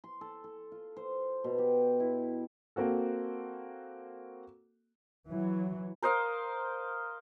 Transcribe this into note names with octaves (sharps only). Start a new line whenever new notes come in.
C6
A4
A4
F4
C5
B2
G4
E4
A#3 C4 F#4 A4
E3 F#3
A#4 C5 D#5 F5